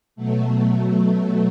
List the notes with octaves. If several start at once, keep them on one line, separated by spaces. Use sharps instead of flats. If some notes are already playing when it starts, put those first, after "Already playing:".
B2 F#3 A3